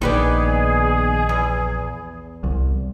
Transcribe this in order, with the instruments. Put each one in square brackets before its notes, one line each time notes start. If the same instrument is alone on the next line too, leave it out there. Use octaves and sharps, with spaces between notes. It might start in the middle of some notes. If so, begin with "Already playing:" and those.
[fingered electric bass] A#1 [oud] D#3 B3 D5 [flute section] G#4
[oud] E2
[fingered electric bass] C2